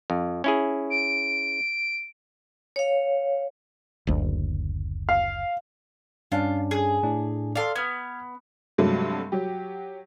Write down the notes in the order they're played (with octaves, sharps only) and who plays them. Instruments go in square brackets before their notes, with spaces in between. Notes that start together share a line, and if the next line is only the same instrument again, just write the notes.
[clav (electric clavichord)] F2
C#4 E4 G#4
[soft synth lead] D7
[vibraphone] C#5 F5
[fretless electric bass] F#1 D2
[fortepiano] F5
[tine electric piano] G2 C#4 D4 [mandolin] F4
[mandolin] G#4
[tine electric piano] A2 D4
[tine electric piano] A4 D5 [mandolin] F5 C6
[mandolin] B3 [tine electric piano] F6 G#6
[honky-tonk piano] G2 C3 F#3 G#3 A3
F#3 G4